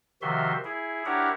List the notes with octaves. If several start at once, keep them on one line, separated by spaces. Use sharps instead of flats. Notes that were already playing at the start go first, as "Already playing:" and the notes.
C3 D#3 F3 F#4 E5 C6
E4 G#4
D4 E4 G4 A#4 C#5 F#5